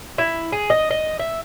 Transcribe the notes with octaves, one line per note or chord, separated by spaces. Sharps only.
E4
G#4
D#5
D#5
E5